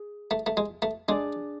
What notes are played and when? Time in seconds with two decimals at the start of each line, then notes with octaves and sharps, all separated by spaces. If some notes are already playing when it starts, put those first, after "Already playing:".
Already playing: G#4
0.31 A3
0.46 A3
0.57 G#3
0.82 A3
1.08 G#3 D4 G#4 D5